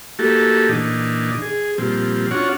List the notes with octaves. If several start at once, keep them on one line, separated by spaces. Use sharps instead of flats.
A3 A#3 E4 F#4 G4 A4
A#2 E3 D4 D#4
G#4
A#2 F3 G3 C4
C#4 D4 F4 F#4 C#5 F#5